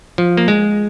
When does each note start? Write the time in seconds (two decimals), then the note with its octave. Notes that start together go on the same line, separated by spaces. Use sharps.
0.18 F3
0.37 A#3
0.48 G#3